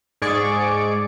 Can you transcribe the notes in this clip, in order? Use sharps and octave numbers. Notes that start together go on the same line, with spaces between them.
G#2 G#4 D5 C#6 D7